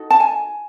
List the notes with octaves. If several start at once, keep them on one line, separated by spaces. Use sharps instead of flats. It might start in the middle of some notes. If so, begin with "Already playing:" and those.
Already playing: D#4 F#4 A4
A5
G#5